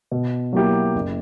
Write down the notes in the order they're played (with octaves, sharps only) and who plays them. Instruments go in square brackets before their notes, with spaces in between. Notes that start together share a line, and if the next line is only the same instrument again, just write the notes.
[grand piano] B2
F#3 A#3 E4 G4
F#1